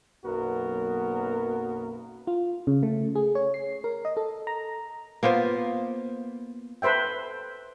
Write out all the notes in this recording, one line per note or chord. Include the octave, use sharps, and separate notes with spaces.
B1 F#2 A#3 B3 F#4 A#4
F4
C#3
A3
G#4
C#5
C7
A#4
D#5
A4
A#5
A#3 B3 F4 C5
A4 B4 C5 E5 G5